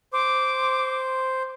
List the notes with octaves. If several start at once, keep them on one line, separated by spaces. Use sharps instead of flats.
C5 D6